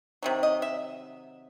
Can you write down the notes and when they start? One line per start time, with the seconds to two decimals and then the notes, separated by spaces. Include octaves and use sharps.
0.23 C3 D#3 F#3
0.43 D#5
0.62 E5